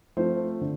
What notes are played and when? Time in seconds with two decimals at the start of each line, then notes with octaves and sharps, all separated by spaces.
0.17 F3 A3 C4 F4 C5
0.61 D3